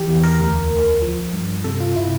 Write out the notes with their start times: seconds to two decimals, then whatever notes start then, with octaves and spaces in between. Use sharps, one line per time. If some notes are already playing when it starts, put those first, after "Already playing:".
Already playing: E3 G4
0.08 E2
0.23 A#4
0.39 D2
0.71 D2
1.02 F3
1.33 G2
1.64 C3 A4
1.80 F4
1.96 C3 E4